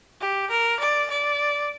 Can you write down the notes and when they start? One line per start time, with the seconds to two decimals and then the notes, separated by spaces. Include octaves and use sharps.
0.21 G4
0.50 A#4
0.80 D5
1.10 D5